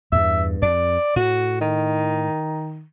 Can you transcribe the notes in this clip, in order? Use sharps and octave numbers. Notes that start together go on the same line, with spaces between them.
E2 G2 E5
F2 D5
A2 F#4
D#3